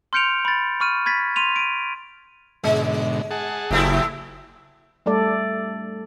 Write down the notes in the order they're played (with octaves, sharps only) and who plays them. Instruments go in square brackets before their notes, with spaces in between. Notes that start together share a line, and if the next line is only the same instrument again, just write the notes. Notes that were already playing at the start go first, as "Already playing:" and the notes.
[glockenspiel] C6 F6 G6 C#7 D7 F7
B5 A6
B5 C#6 F6 D#7
B5 G#6 A6 B6
C6 D#7 F7
D7 D#7
[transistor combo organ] G#2 B2 D3 [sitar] G#3
[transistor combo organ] G#4 F#5 A5
[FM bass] F#1 [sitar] A2 A3 E4 [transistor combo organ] F#3 G4
[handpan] G3 A3 A4 D5